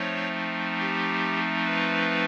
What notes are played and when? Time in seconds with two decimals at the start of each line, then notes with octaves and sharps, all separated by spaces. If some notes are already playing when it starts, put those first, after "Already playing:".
Already playing: F3 A3 C4 D#4 C#5
0.79 G4
1.66 B4